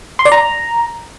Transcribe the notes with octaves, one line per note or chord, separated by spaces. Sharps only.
C6
D5
A#5